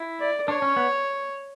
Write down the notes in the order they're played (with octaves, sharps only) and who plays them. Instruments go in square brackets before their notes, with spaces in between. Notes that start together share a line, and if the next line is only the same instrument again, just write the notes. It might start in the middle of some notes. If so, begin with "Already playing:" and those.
Already playing: [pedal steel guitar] E4
[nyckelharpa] D5
[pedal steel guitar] D4 [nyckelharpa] C#5
[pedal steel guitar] C#4
B3